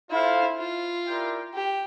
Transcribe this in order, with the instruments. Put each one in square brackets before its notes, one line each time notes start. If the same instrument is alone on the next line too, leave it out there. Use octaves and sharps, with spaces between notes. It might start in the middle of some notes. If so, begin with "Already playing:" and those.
[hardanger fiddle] E4 [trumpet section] F4 A4 C5 F5
[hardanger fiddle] F4
[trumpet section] E4 G4 A#4 D5 G5
[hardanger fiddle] G4